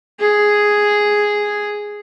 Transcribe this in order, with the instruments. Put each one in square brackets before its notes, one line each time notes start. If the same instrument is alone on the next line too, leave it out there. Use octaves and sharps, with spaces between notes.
[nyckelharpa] G#4